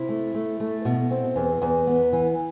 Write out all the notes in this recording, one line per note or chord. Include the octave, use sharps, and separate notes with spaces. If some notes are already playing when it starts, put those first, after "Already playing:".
Already playing: C3 E4
A3
A3
A3
B2
C4
E2
E2
B3
E3